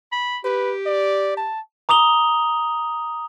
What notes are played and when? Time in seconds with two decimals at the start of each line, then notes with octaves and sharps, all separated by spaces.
0.12 B5
0.45 G4 B4
0.86 D5
1.37 A5
1.89 A#5 D6 D#6 F7 G7